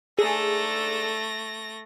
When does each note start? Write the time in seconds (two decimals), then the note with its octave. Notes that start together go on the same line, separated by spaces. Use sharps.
0.19 G#2 A3 D4 G#4 A4 A#6